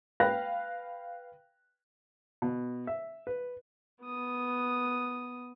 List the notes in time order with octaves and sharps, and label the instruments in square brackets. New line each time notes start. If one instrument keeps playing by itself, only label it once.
[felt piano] B4 F5 G5 B5 F#6 A#6
[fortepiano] B2
E5
B4
[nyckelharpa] B3 D#6